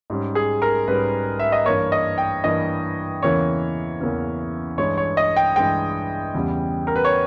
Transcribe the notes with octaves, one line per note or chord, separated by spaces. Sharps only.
G#2 G3 C#4
G#4
A#4
G#2 G3 C#4 B4
E5
D#5
G2 E3 A#3 C#5
D#5
G5
G2 E3 A#3 D#5
E2 C#3 E3 A#3 C#4 C#5
E2 C#3 E3 A#3 C#4
G2 E3 G#3 C#5
C#5
D#5
G5
G2 E3 G#3 G5
E2 C#3 G3
A#4
B4
C#5